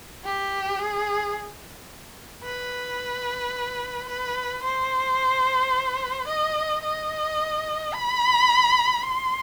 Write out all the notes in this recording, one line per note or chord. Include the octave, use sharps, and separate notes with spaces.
G4
G#4
B4
B4
C5
D#5
D#5
B5
C6